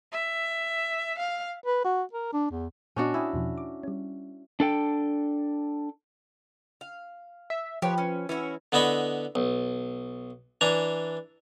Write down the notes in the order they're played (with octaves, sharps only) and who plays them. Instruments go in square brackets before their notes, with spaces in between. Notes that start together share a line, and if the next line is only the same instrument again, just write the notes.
[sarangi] E5
F5
[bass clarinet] B4
F#4
A#4
D4
E2
[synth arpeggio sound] A#2 B3 D#5 [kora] C#4 D4 F#4
[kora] E4 [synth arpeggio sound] G5 G#5 D#6
[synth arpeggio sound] E2 B2 F3
D6
G3 C#4
[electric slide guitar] D4 A4 G5
[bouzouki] F5
[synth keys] E5
[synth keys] F3 B4 [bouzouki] G4 C#5
[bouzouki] C#4
[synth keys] E3 [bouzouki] C#4 E4 F#4
[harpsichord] D3 B3 E4 D#5 B5 C#6
B1
E3 D4 G#5 A#5